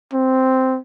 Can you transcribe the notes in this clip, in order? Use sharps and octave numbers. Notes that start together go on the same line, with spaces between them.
C4